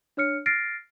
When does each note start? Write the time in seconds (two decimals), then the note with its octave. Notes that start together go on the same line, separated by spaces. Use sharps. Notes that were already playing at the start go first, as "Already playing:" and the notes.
0.17 D4 C#5 F6 C#7
0.46 F6 A6 A#6 C7 D7